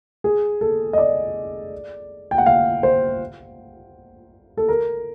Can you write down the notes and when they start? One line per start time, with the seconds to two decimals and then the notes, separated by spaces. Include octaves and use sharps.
0.24 G#4
0.61 A4
0.93 D#5
0.98 D5
2.31 G5
2.38 F#5
2.46 F5
2.83 C5
4.57 A4
4.68 A#4